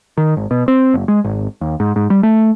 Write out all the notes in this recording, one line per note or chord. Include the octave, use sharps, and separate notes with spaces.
D#3
G#1
B2
C4
F#1
G#3
G#1
D#2
G#2
G#2
G3
A3